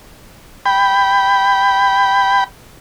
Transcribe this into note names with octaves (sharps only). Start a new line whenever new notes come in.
G5 B5